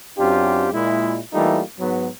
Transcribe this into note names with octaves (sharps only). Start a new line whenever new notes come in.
F#2 C4 D4 F4 G4
A#2 G#3 E4
E3 G3 A3 A#3 D#4 F4
G#2 F#3 B3